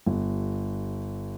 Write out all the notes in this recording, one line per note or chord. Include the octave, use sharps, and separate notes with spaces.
G1